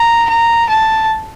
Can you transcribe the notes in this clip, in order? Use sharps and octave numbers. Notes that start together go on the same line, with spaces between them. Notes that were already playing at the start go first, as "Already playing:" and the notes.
Already playing: A#5
A#5
A5